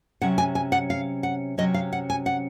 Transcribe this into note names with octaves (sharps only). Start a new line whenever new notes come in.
C3 F#3 C#4 F#5
G#5
G#5
F#5
F5
F#5
C3 F#3 C#4 D#5
F5
F#5
G#5
F#5